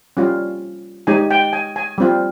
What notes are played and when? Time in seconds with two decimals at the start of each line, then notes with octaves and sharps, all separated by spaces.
0.17 G3 C#4 F4
1.07 G#3 D#4 G4 G#5
1.31 G5
1.53 G#5
1.76 G#5
1.98 G3 C4 F4